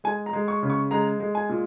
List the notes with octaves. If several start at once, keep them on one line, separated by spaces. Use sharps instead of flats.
G#3 G#5
A#5
G#3
C#6
C#3
C#6
G#3 A#5
G#3
G#5
A#2